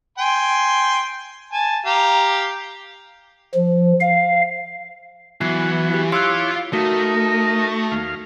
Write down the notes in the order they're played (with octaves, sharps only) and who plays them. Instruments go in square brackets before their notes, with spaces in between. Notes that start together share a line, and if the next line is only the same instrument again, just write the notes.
[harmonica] G5 G#5 C6
G#5 A5
G4 F5 A#5
[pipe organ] F3
F5
[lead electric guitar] E3 [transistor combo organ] F#3 B3 F#4 [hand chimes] C7
[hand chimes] G4
[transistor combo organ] E4 C#5 D6 [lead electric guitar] F4 F5 [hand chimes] C6 E6 F#6
[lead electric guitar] A3 [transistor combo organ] D#4 A#4 [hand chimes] F#4
[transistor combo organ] D#2 F5